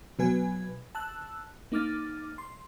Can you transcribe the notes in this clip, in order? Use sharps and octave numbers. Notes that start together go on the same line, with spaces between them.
B2 F#3 B4 G#5 G#6
A5 E6 F#6
A#3 D#4 D6 F6 A6
C6